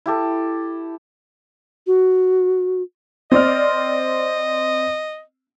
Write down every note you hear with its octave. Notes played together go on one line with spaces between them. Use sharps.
E4 G4 A4
F#4
C4 D5 D#5 F6